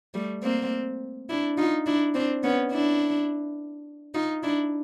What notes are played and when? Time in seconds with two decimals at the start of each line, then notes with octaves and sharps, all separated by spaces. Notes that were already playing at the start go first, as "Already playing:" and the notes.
0.14 G3 A3
0.43 A#3 C4
1.29 D4 E4
1.57 D#4 F4
1.86 D4 E4
2.14 C4 D4
2.43 B3 C#4
2.72 D4 E4
4.14 D#4 F4
4.43 D4 E4